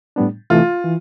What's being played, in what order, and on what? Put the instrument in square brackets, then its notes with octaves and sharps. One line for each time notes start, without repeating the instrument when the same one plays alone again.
[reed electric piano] A2 G3 B3 D4
[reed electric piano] C3 E3 A3 [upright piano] F4
[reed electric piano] E3